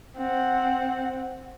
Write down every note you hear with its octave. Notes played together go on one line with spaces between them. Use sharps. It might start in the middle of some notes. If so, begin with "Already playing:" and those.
C4 F#5